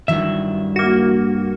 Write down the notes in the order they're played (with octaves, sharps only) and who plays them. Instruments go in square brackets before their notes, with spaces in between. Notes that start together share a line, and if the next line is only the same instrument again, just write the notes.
[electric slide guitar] G2 E5 [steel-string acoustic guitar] D#3 F#3 E4
[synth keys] A#3 F#4